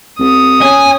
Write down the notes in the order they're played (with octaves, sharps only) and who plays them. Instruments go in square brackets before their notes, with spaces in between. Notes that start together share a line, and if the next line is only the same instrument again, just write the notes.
[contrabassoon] C2 [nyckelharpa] D#6
[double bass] C#4 [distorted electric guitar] G#5